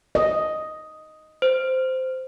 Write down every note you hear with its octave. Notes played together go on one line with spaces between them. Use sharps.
D#5
C5